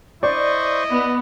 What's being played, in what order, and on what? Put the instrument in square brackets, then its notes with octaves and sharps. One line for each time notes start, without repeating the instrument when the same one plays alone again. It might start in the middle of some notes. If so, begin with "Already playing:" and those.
[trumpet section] E4 D#5 [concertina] C5 C#6 [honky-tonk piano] D5
[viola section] B3